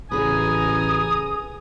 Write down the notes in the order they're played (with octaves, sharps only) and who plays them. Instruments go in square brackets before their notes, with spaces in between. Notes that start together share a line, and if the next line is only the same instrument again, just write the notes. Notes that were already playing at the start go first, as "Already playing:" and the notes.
[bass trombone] A1 [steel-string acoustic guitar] C#3 G#4 B4 [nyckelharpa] G#5 A#5 [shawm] D#6